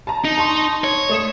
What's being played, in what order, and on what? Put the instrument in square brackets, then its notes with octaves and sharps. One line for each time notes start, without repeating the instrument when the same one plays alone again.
[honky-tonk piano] A5 A#5
[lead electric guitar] D#4
[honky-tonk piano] A5 C6 C#6
[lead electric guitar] C#5
[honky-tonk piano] A3 D#6 E7